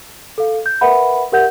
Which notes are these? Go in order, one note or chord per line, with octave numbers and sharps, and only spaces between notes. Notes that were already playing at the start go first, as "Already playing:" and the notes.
A4 F5
G6
A#4 B4 E5 F#5 B5
G4 A#4 E5 F#5 G6